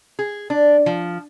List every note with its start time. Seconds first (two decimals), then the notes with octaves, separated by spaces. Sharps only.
0.19 G#4
0.50 D4
0.86 F3